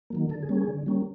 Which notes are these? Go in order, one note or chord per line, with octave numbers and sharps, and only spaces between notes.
D#3 F#3 A#3
D3 A4
G#4
G3 A#3 C#4
G#4
D3
G3 A#3 C#4